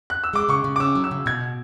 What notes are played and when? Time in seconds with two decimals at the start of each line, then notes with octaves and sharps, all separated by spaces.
0.10 F#6
0.24 E6
0.33 G#3 D6
0.49 C#3 C#6
0.64 C#3
0.76 D6
0.80 C#4 E6
0.95 F#3
1.04 E6
1.11 C#3
1.26 B2 G#6